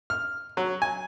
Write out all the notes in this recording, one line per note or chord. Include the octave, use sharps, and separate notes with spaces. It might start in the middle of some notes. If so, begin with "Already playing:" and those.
F6
F#3
G#5